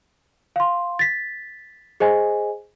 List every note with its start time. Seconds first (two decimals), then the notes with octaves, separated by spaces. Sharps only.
0.56 F5 C6
0.99 A6 B6
2.00 G#4 C5 D#5 G#5